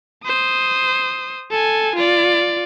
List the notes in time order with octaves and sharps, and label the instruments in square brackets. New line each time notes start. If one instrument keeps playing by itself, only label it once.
[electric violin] C5 D#6
A4 G#5
F4 D5